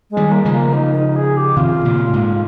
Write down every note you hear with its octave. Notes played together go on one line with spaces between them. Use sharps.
G#3
D#3 G3
A#3
C#3 F3 G#3
A#3
D#4
D#4
G#4
G4
C3 D#3 F4
A#2 C#3
G#2 C3